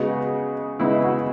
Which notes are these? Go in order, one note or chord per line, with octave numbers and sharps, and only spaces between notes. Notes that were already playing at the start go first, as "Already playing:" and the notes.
Already playing: C#3 G#3 B3 D#4 F#4
C#3 G#3 B3 D#4 E4
F#4